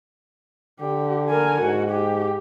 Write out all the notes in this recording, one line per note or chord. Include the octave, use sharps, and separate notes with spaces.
D3 G4
A#4 G#5
G#2 F#4
G4